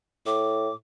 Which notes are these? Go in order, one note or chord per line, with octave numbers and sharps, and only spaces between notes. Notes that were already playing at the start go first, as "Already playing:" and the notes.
A2 D6